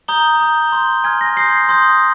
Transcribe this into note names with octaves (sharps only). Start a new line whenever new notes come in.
A#5 D#6 G6 G7
A#5 D#6 G6
C6 G6
G#5 C6 F6 G#6
A#6
C6 D#6 G6 C7
C6 D#6 G6